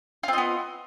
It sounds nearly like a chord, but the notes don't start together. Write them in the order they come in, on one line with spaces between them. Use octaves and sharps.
F4 C4 D#5 B3